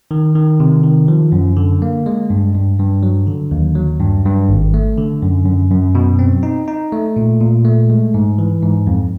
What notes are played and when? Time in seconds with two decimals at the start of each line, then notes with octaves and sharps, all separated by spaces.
0.11 D#3
0.35 D#3
0.60 C3
0.84 D#3
1.08 F3
1.32 F#2
1.57 D3
1.82 A#3
2.06 G#3
2.30 G2
2.55 G2
2.79 G2
3.03 F#3
3.27 D3
3.51 D#2
3.75 F#3
4.00 G2
4.25 G2
4.49 G#1
4.74 A3
4.97 D3
5.22 F#2
5.46 F#2
5.71 F#2
5.95 B2
6.19 C4
6.43 D#4
6.68 D#4
6.92 A3
7.16 A#2
7.41 A#2
7.65 A3
7.90 G#3
8.14 G#2
8.39 E3
8.63 G#2
8.87 F2